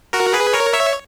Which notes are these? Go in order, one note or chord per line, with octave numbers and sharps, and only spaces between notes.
F#4 A#4
G#4 B4
A#4 C#5
C#5 E5